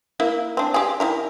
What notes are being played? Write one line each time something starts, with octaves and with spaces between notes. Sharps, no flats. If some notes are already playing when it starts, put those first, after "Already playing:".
A#3 E4 E5
C4 D4
G4 G#4
D#3 E4 A#4